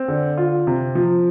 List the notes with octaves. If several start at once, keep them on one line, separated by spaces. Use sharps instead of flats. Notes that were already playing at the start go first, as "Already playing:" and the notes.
Already playing: C4
D3
F4
C3
F3